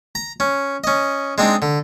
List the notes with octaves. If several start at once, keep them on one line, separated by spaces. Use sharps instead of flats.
A#5
C#4
C#4 D#5
G#3 C4 D4 D#4
D3